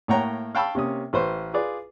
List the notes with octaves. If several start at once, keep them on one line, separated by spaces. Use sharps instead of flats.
A2 A#3 C#5 F#5 G5 A#5
F5 G5 A5 B5 C#6 E6
C3 A#3 C#4 D#6
A1 B4 C5 C#6
F4 G#4 B4 D5